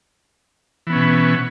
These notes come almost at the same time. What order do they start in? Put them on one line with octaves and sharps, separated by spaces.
E3 B3 C#4 B2